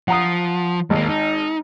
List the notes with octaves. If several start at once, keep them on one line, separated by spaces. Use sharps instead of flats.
F3 F#5 A#5 D#6
G#1 D#2 A#3
D#4